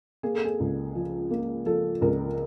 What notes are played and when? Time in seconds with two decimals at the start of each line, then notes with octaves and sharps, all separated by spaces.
0.23 A#3 G#4
0.35 A4
0.45 G#4
0.60 C#2
0.95 F3
1.30 A#3
1.66 F3 A4
2.01 C#2 A#4